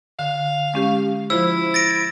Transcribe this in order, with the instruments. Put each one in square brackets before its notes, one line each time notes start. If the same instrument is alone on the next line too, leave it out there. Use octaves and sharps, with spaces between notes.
[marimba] D3 [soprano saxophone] F5
[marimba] G#3 C#4 G4
[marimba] F3 F4 C5 [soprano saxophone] E4 [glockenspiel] E6
[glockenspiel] A6 A#6 D7